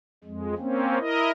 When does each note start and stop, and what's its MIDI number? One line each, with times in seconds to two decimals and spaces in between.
0.24 0.54 41
0.24 0.54 56
0.58 0.99 58
0.58 0.99 60
0.58 0.99 61
0.99 1.31 64
0.99 1.31 70
0.99 1.31 75